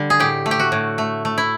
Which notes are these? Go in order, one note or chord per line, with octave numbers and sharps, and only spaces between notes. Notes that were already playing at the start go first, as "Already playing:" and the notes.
Already playing: D3 G3
G#4
A2 G4
A3
G4
F#4
A2
A3
A3
E4